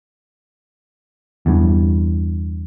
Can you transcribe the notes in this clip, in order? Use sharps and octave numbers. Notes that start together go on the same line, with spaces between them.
E2 G2